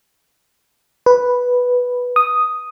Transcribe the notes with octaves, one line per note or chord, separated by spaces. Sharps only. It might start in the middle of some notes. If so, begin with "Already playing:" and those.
B4
D#6